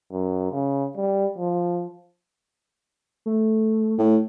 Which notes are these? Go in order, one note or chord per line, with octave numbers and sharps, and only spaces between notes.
F#2
C#3
G3
F3
A3
A2